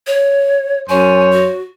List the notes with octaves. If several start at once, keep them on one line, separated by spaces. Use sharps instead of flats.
C#5
F#2 C5 C#5 G#5
F#4